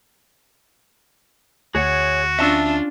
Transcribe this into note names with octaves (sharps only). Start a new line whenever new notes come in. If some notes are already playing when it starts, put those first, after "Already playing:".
D2 F#4 G#4 C#5 F#5
C#4 D4 F4 E5 A5 E6